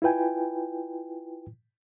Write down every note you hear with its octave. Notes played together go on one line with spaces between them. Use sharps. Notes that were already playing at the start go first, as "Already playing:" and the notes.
E4 F4 B4 G5 G#5